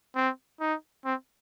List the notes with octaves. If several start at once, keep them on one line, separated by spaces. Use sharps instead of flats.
C4
D#4
C4